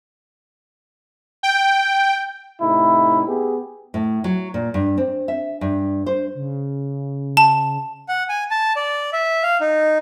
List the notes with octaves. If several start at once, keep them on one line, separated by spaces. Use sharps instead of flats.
G5
A2 C3 D#4 E4
B3 G4 G#4
A2
F#3
A#2
G2
C4
E5
G2
C5
C#3
A5
F#5
G#5
A5
D5
E5
F5
D#4